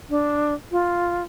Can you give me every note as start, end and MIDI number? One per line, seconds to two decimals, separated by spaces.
0.10 0.54 62
0.72 1.23 65